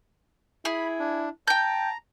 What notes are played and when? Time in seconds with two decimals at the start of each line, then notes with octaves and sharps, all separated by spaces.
0.65 E4 G#4 B5
0.99 D4
1.47 G5 A5 A#5 G6